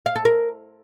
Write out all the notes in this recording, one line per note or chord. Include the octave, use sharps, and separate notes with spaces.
F5
A4
A#4